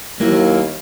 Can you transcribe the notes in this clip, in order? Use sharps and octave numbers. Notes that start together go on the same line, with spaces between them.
D#2 F#3 A#3 E4